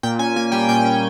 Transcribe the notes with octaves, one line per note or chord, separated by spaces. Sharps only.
A#2 G5
C#4 G#5
A#3 G#5
G3 G5
A#2 G5
C#4